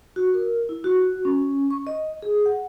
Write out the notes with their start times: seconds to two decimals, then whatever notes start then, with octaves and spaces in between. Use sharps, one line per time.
0.16 F#4
0.34 A#4
0.69 E4
0.84 F#4
1.25 C#4
1.70 C#6
1.87 D#5
2.22 G#4
2.46 F#5